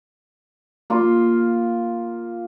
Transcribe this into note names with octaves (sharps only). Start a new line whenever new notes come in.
A#3 F4